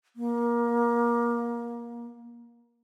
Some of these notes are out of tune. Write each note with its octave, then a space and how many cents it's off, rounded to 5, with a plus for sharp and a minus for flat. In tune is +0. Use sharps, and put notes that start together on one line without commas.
A#3 +25